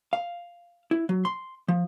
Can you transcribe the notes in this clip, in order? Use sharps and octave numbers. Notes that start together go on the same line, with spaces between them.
F5
E4
F#3
C6
F3